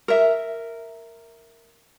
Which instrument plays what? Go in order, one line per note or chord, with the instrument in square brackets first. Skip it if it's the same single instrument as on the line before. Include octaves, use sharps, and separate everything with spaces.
[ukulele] A#4 E5